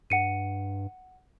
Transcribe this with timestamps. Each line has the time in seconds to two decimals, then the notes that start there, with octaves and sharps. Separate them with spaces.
0.10 G2 F#5 C#7 D#7